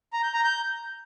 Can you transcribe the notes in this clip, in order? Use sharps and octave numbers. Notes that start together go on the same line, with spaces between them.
A#5
G6
A#5
G6